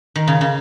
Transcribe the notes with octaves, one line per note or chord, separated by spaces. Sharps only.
D#3
C#3
C#3